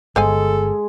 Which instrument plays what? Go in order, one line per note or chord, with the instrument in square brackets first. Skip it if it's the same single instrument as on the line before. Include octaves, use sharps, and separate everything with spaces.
[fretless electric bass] G1 [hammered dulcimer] G#3 [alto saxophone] A4 [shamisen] C5 F5 G#5